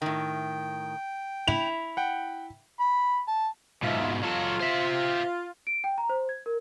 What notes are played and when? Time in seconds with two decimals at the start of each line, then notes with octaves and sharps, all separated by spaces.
0.02 A2 D#3 G5
1.48 E4 F7
1.97 F#5 G5
2.80 B5
3.28 A5
3.83 G#2 B2 F4 E5
4.23 F#3 F4 A4
4.61 C5 E5
5.67 D7
5.84 G5
5.98 A#5
6.09 C5
6.29 G#6
6.46 A#4